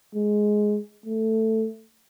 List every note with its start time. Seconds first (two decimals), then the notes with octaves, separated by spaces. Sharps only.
0.15 G#3
1.06 A3